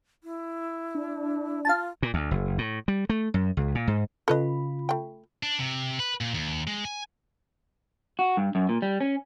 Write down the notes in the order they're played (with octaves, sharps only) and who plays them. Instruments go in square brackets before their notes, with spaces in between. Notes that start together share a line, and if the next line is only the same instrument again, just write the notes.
[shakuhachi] E4
[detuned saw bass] D4
[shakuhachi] F4 [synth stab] F5 A5
[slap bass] A#2
D2
F#1
A2
G3
A3
F#2
C#2
A#2
G#2
[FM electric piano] C#3 F4 B5 [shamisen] A4 B4 D#5
[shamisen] A3 G5
[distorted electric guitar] D4
C3
B4
A#2
D#2
G#3
G#5
[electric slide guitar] F#4
G2
F#2
A#2
G3
C#4